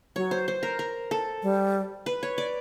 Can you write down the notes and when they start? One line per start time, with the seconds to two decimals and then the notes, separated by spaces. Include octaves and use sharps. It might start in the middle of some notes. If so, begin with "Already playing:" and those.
0.16 F#3 C#5
0.31 C5
0.48 C5
0.63 A#4
0.79 A#4
1.11 A4
1.43 G3
2.06 B4
2.23 C#5
2.38 D5